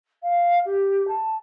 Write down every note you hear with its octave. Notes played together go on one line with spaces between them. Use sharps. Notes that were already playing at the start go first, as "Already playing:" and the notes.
F5
G4
A5